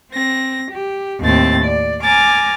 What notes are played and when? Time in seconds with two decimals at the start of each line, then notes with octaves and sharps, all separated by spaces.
0.13 C4 A#6
0.70 G4
1.21 D#2 A2 C4 A6
1.65 D5
2.04 G#5 A#5 D6 F6 A6